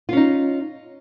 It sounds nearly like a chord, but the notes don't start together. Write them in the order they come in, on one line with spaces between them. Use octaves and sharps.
F4 C#4 D#4